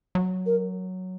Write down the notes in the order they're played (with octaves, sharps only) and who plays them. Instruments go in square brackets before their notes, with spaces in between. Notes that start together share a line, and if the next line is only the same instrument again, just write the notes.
[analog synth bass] F#3
[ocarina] A#4